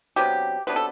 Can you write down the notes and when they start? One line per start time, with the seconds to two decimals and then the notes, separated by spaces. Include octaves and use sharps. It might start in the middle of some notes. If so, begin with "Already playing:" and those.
0.16 C3 F#3 B3 D4 G4
0.67 C3 F#3 B3 D4 B4
0.76 A4